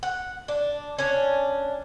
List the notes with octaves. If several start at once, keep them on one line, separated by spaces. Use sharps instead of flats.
F#5
D4
C#4 D4